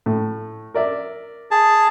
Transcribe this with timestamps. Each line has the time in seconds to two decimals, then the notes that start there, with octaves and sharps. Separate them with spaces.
0.06 A2
0.74 A#4 D5 E5
1.51 G#4 A5